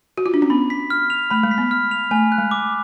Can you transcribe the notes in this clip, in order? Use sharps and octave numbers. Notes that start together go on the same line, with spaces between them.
F#4
F4
D4
C#4
B3 B5
B6
F6
F7
A3 B5
G#3
B6
B3
F6
F7
A3 G#5
F#6
G#3
D6